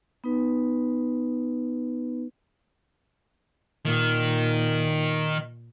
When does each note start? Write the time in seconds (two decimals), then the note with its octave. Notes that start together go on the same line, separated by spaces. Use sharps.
0.24 B3 D#4 B4
3.85 A#2 D#3